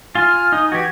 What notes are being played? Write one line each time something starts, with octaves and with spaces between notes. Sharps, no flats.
F4 G#5 F6
D#4 D#6
E3 F#4 G4 G#6